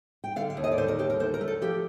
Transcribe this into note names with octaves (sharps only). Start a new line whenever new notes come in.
G5
D3 F5
F5
D#2
D#5
D5
D3 C5
A#4
D#2 G4
A#4
D3 C5
A#4
A3
A4
F3 G4